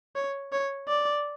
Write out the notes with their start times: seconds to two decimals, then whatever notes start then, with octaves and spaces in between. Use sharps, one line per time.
0.16 C#5
0.52 C#5
0.88 D5